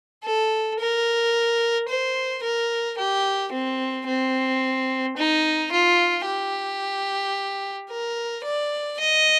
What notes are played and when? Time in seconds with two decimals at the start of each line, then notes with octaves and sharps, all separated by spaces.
0.24 A4
0.80 A#4
1.89 C5
2.43 A#4
2.98 G4
3.52 C4
4.07 C4
5.17 D#4
5.72 F4
6.26 G4
7.90 A#4
8.45 D5
9.00 D#5